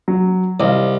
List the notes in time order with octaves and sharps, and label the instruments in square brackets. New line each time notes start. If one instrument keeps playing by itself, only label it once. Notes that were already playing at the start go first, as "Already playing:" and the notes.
[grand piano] F#3
[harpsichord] C2 [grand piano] D#5 F5